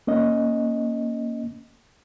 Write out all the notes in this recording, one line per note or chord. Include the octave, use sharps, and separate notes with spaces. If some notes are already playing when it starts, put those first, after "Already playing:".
A#3 C#4 D#5